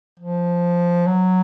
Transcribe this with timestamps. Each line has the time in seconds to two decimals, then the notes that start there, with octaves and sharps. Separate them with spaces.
0.19 F3
1.06 F#3